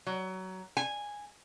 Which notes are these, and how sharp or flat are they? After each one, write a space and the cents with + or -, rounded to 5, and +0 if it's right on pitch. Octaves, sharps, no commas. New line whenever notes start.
F#3 +20
G#5 -10